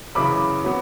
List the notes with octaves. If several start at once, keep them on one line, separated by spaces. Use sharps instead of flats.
F#2 C#3 E3 B5 D6
F#3 B3